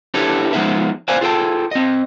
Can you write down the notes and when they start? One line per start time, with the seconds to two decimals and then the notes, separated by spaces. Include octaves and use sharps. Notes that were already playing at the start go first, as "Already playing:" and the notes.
0.14 D4 E4 G4 A4 B4 C#5
0.53 F3 G#3 B3 D#4 G#4 E5
1.08 B4 C5 D5 F5 G#5
1.21 F4 G#4 A4 E5 G5 A5
1.71 C4 D#5